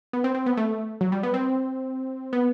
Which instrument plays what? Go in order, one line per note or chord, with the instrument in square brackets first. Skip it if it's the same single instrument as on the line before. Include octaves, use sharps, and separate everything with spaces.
[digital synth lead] B3
C4
C4
B3
A3
F#3
G3
B3
C4
B3